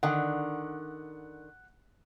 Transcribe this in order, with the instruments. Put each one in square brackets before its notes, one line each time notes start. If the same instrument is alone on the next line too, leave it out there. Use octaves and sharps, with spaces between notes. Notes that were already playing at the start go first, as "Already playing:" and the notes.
[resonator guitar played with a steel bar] D3 D#3 [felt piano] F#5